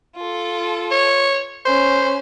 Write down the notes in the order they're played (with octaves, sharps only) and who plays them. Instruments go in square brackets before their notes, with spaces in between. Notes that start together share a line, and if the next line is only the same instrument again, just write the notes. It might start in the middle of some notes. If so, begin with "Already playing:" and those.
[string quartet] F4 A4
[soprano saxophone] C#5
[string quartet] C#4 [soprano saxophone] C5